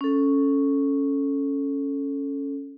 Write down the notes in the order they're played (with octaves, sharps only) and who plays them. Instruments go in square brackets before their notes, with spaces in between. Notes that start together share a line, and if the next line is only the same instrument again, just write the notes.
[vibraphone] C#4 A4